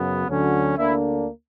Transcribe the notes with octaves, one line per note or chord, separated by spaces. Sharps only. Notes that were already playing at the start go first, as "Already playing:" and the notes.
Already playing: F#2 C#3 F#3 B3
D2 D3 F#3 C#4
D2 D3 A#3 D4 E4